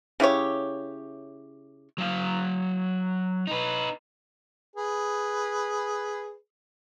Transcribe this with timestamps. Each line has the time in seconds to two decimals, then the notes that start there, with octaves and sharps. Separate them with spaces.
0.20 C#3 E4 G4 C#5
1.98 F#3 F5
3.47 D#4 B4
4.76 G#4 B4